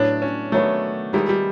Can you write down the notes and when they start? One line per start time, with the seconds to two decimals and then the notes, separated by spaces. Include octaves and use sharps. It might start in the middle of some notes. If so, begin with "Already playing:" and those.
Already playing: A2 F#3 B3 D4 E4
0.22 C#4
0.52 D#3 F#3 A3 B3
1.13 D#3 G3 G#3 B3 E4
1.29 G3